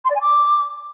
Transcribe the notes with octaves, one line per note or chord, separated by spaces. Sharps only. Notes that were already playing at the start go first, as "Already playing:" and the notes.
C6
D5
G#5
D6